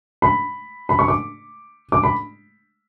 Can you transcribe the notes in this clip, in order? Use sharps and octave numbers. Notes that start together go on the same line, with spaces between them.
B5
B5
C#6
D6
D6
B5